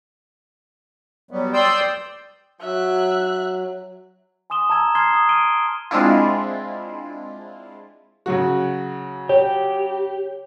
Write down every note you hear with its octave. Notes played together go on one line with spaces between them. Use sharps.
F#3 G3 B3
D5 G5 C6 D#6 E6 G6
F#3 E5 F#6
G#5 C6 D#6 E7 G7
A5 A#5 E6 G#6 E7
A#5 C6 F6 G#6 C7 G7
D#6
F6 D7 D#7 G7
G#3 C4 D4 E4 F4
C#3 F#3 F#4
G4 C#5